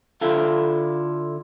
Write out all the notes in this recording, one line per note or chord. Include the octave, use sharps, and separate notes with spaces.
D3 E4 F4 A4